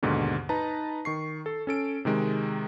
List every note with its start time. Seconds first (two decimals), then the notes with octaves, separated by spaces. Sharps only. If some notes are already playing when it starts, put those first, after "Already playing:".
0.03 D#2 G#2 B2 D3
0.49 D#4 B4 A5 A#5
1.05 D#3 C#6 C7
1.46 A4
1.67 C#4 A4 D7
2.05 C3 D#3 G#3